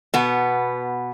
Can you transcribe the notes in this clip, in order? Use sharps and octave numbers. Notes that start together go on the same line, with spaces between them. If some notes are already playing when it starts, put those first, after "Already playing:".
B2 B3